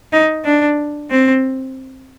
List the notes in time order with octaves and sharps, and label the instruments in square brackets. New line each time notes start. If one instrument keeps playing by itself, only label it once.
[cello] D#4
D4
C4